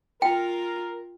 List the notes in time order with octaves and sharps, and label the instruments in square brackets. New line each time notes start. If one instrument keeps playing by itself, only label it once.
[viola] F4 [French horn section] A#4 [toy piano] G5